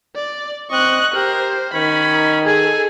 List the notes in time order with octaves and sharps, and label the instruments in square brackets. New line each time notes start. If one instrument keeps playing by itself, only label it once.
[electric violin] D5
[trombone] C4 [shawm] D#5 [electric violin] C#6 F#6
[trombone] G4 [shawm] A#4 [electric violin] C5
[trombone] D#3 [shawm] C#4 [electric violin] B5
[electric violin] G#4 A4 [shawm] G#5